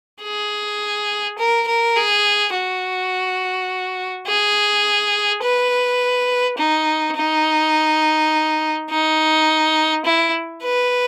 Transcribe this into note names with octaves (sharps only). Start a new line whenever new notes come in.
G#4
A#4
A#4
G#4
F#4
G#4
B4
D#4
D#4
D#4
E4
B4